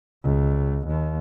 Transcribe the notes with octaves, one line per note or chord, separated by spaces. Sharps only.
C#2
D#2